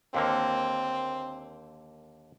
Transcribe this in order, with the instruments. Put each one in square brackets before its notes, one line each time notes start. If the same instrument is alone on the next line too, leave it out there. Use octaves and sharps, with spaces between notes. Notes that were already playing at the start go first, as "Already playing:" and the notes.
[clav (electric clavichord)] D#2 D3 A#3 [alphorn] C4